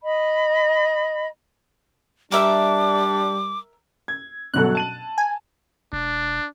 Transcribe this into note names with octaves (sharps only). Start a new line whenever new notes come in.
D#5 B5
G3 D4 A#4 E5 D6
G#6
G1 B2 F#3 A4 F#6
A5 D#7 F#7
G#5
E1 D4